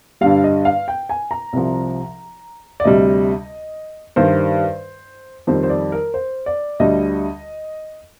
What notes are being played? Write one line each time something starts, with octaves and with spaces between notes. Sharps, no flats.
G2 D3 G3 F5
D#5
F5
G5
G#5
A#5
C2 C3 F3
D5
D2 C3 G3 D#5
G2 D#3 G3 C5
F2 D#3 G3 C5
C5
D5
A#4
C5
D5
D2 D3 G3 D#5